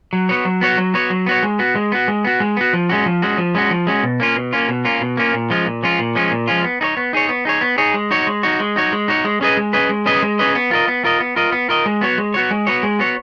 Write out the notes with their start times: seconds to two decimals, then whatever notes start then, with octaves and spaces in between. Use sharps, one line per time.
0.13 F#3
0.29 B3 F#4 C#5
0.45 F#3
0.61 B3 F#4 C#5
0.78 F#3
0.94 B3 F#4 C#5
1.10 F#3
1.26 B3 F#4 C#5
1.43 G#3
1.59 B3 F#4
1.75 G#3
1.92 B3 F#4
2.08 G#3
2.25 B3 F#4
2.40 G#3
2.57 B3 F#4
2.73 F3
2.89 G#3 C#4 F#4
3.06 F3
3.22 G#3 C#4 F#4
3.38 F3
3.55 G#3 C#4 F#4
3.71 F3
3.87 G#3 C#4 F#4
4.03 B2
4.20 A#3 C#4 F4
4.36 B2
4.53 A#3 C#4 F4
4.69 B2
4.85 A#3 C#4 F4
5.01 B2
5.17 A#3 C#4 F4
5.33 A#2
5.50 F3 G#3 C#4 F4
5.66 A#2
5.83 F3 G#3 C#4 F4
5.99 A#2
6.15 F3 G#3 C#4 F4
6.31 A#2
6.47 F3 G#3 C#4 F4
6.64 B3
6.81 D#4 G#4 C#5
6.97 B3
7.13 D#4 G#4 C#5
7.29 B3
7.45 D#4 G#4 C#5
7.61 B3
7.78 D#4 G#4 C#5
7.94 G#3
8.11 D#4 F#4 C#5
8.27 G#3
8.43 D#4 F#4 C#5
8.60 G#3
8.76 D#4 F#4 C#5
8.93 G#3
9.08 D#4 F#4 C#5
9.25 G#3
9.41 C#4 G#4 B4 D#5
9.57 G#3
9.73 C#4 G#4 B4 D#5
9.90 G#3
10.06 C#4 G#4 B4 D#5
10.22 G#3
10.39 C#4 G#4 B4 D#5
10.55 B3
10.71 F4 A#4 D#5
10.88 B3
11.04 F4 A#4 D#5
11.20 B3
11.36 F4 A#4 D#5
11.52 B3
11.69 F4 A#4 D#5
11.86 G#3
12.01 B3 F#4 C#5
12.18 G#3
12.34 B3 F#4 C#5
12.51 G#3
12.67 B3 F#4 C#5
12.83 G#3
12.99 B3 F#4 C#5